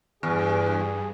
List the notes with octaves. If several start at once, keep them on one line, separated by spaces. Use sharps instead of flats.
E2 G2 G#4